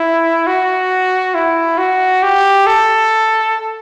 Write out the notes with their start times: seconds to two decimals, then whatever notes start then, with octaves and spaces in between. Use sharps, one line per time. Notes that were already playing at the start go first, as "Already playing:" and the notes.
Already playing: E4
0.47 F#4
1.35 E4
1.78 F#4
2.23 G4
2.67 A4